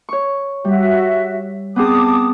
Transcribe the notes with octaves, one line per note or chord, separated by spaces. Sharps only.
C#5 C#6
G3 F#4 E5
B3 C4 G#4 A5 D6 D#6